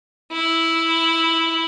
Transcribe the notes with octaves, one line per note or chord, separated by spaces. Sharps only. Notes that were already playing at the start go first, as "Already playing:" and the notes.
E4